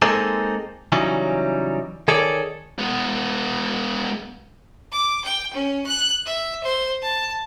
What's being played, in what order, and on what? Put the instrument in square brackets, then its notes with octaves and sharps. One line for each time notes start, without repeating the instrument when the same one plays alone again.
[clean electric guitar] G#3 A#3 C4 D#4 G#4 A4
C#3 E3 F#3 G3 C#4 D#4
D#3 G#4 A4 C#5 D5
[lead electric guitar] G#3 B3
[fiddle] D6
G5
C#4
F#6
E5
C5
A5